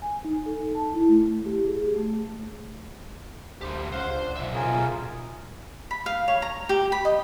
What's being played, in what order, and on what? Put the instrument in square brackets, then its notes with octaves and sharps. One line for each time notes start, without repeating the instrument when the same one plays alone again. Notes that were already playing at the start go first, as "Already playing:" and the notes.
[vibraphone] G#5
D#4
A4
A5
E4
A3
G4
G#4
A3
[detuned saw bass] D2 [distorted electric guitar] G#2 G4 [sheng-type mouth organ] C5
[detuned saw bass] C#2 [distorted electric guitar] C5 C6 [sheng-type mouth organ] F5 F#5
[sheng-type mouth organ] D4
[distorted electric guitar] B1 E5
[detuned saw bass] C#3 [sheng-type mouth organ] F4 G#4 A#4
[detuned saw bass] B2
[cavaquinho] B5
F5
C#5
A#5
G4
B5
D#5